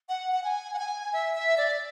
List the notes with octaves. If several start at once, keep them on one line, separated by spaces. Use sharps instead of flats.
F#5
F#5
G#5
F#5
G#5
E5
E5
D5